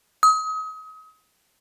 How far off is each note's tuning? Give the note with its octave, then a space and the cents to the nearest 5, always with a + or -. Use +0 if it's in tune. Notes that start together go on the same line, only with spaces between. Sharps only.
D#6 +35